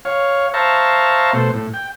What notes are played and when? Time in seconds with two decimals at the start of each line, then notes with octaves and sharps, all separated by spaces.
0.05 C#5 F5
0.54 C5 E5 F5 A5 A#5 C#6
1.33 B2 A3 C5
1.54 A2
1.74 G5